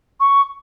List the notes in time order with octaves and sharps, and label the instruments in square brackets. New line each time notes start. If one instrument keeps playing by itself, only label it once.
[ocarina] C#6